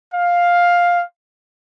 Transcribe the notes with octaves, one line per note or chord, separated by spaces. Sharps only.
F5